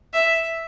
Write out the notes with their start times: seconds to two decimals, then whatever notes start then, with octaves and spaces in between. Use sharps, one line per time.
0.13 E5